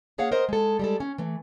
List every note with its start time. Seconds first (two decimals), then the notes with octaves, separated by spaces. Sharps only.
0.18 A#3 G#4 C#5 F5 F#5
0.32 A#4 C5 D#5
0.49 G#3 A4
0.79 G3 G#3 A4
1.00 C#4
1.18 E3 A3